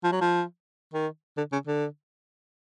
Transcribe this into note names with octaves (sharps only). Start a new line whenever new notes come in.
F3
F#3
F3
D#3
D3
C#3
D3